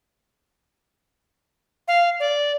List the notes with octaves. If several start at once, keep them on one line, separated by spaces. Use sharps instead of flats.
F5
D5